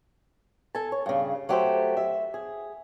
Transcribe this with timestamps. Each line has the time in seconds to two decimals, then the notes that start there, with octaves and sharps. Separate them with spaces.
0.75 A4 G#5 A5
0.92 C#5
1.06 G2 C#3
1.49 F#3 A3 G4 A4 B4 C5
1.97 E5
2.34 G#4